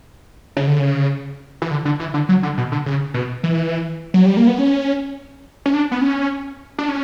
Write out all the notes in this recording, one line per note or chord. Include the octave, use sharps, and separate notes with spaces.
C#3
D3
C#3
E3
D3
D3
E3
D3
F#3
D3
B2
D3
C#3
B2
E3
F#3
G3
A#3
B3
C#4
C#4
D4
B3
C#4
D4
C#4